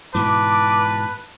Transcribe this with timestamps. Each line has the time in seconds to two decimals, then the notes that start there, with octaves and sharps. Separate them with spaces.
0.15 G#2 B2 E3 B4 A5 D6